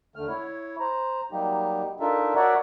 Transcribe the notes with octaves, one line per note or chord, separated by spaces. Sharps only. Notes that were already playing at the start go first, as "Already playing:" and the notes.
D#2 D3 A3 F6
E4 C#5
C5 A#5
F#3 G3 A#3 D#4 G4
D4 D#4 F4 A4 A#4 E5
F#4 A#4 C#5 D5 E5 F#5